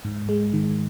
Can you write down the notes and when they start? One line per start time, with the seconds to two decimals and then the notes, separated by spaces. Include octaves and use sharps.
0.05 G#2
0.29 G#3
0.53 D#3